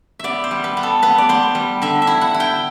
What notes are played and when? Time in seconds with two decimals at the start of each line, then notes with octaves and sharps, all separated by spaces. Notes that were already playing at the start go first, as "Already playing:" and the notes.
0.19 B3 D5 E5
0.44 C5
0.51 G3
0.64 B4
0.77 B3
0.83 A4
1.02 B3 B4
1.18 D5
1.29 B3 C5
1.55 G3
1.82 D3 E5
2.02 E5
2.07 E4
2.21 F#5
2.34 E4
2.40 G5